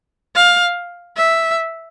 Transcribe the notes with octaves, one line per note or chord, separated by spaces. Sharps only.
F5
E5